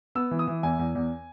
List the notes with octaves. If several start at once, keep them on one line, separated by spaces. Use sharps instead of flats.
B3 E6
E3
D#6
E3
E2 G#5
E2
E2